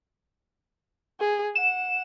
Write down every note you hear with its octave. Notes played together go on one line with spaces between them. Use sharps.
G#4
F#5 E7